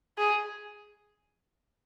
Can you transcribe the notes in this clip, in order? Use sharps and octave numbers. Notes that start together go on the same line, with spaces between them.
G#4